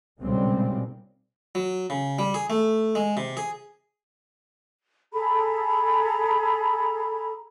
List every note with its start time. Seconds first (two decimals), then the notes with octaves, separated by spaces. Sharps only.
0.21 B1 A#2 C#3 G3 G#3 C4
1.55 F#3
1.90 C#3
2.19 G3
2.34 G#4
2.50 A3
2.95 G#3
3.17 C3
3.37 G#4
5.13 G#4 A4 A#5 B5